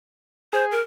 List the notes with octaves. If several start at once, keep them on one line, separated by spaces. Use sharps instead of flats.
G#4 C5
A#4